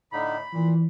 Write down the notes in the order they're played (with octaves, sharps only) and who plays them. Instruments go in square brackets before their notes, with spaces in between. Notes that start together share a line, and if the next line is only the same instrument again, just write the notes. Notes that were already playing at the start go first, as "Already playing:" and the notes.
[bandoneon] A2 D3 D#4 [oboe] B5
[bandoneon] A#2 [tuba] E3